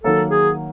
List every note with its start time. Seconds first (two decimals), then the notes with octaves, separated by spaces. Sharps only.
0.03 D#3 F#3 A#3 A4
0.31 G#4